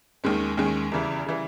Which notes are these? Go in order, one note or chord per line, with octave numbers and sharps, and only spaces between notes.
D#2 D#3 G#3 C#4
D#2 D#3 G#3 C#4
E2 C#3 E3 G3
C#3 E3 G3